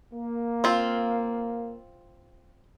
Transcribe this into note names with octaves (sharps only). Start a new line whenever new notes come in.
A#3
C4 F4